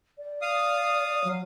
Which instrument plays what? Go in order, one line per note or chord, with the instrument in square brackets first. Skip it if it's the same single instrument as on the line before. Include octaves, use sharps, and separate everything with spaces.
[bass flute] D5
[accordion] F5 D#6
[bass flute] F#3